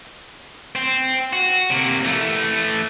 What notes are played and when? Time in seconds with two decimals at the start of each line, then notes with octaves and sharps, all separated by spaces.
0.75 C4
1.33 F#4
1.70 C3 A#3
2.05 E3 A3